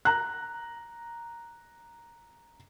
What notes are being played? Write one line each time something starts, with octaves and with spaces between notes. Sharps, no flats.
A#5 F#6